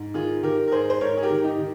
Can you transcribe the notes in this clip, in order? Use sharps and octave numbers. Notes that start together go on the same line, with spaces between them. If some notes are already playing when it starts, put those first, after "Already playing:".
Already playing: G#2
D#3 F4 G#4
D#3 G4 A#4
A#4
G#2 G#4 C5
C5
G#2 A#4 C#5
G#4
G4 A#4
D#3
D#4 G4
D#3